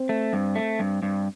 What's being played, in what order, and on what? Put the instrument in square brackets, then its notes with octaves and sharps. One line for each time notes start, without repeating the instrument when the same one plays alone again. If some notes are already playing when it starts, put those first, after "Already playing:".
Already playing: [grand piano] C4
[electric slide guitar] A3
G2
A3
G2
G2